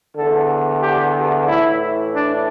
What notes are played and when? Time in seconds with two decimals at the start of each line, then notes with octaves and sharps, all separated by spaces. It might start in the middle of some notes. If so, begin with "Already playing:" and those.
0.16 E2 D3 A4
0.82 G4
1.48 A2 E3 E4
2.15 D4